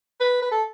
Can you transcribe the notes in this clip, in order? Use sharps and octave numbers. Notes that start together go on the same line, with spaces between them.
B4
B4
A4